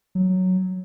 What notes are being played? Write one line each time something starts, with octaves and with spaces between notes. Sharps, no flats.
F#3